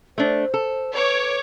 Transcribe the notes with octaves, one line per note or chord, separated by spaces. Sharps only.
A3 D4 C5
A4
B4 C#5 D6